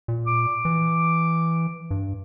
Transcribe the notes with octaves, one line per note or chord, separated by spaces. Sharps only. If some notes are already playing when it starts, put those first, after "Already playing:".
A#2
D6
E3
G2